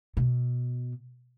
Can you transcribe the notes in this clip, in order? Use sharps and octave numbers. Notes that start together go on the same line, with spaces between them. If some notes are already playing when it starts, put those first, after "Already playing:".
B2